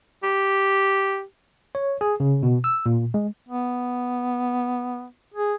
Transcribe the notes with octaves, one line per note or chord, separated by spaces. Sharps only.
G4
C#5
G#4
C#3
B2
E6
A#2
G#3
B3
G#4